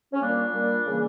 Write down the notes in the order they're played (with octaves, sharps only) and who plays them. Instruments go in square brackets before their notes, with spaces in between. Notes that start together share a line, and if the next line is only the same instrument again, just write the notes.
[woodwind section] C#4
A#2 G3 A#3 D4
A#2 G3 A#3
C#3 E3 G3 A#3